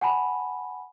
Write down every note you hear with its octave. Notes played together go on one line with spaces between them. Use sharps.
F#5 G#5 A5 B5